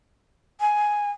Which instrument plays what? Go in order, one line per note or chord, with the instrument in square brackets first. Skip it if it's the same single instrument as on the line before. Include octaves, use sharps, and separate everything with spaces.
[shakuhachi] G#5